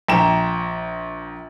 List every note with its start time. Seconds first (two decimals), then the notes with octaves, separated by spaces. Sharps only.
0.08 A#1 G5 A#5 E7